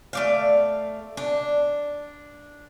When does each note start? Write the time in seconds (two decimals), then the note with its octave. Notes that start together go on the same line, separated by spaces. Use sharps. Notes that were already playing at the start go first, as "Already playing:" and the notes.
0.13 A3 D5 F5
1.17 D4